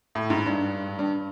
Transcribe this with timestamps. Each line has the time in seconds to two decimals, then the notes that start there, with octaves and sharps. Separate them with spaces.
0.15 A2
0.30 G#2
0.46 G2
0.99 G2